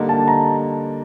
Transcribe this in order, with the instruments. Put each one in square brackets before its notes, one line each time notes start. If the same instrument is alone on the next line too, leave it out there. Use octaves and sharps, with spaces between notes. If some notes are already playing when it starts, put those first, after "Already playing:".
Already playing: [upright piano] D3 G3 A#3 D#4
[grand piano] A5
A#5